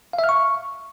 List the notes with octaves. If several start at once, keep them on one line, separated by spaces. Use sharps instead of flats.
F5
E5
F6
C#6